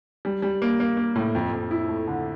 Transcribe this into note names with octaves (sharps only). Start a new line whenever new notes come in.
G3
G3
A#3
A#3
A#3
A2
F2
F2
E4
A3
D3